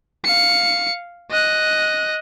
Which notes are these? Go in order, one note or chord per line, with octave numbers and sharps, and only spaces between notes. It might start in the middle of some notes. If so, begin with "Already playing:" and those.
F5 C#7
D#5 F#6